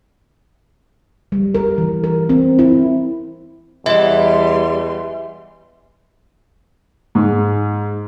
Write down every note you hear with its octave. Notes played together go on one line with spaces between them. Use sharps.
G3
A#4
E3
A#4
C4
E4
E2 E3 G3 D#5 E5 C6
G#2